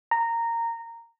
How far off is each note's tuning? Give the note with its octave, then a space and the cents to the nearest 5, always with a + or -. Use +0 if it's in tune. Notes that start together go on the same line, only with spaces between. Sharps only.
A#5 -15